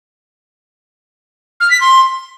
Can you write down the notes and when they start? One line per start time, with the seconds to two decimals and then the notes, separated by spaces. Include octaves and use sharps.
1.60 F6
1.70 B6
1.81 C6